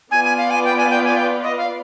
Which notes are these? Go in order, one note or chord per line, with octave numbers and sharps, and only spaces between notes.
B3 F4 B4 D5 G#5
G#5
F5
G#5
G5
G#5
G5
G#5
G5
D#5
F5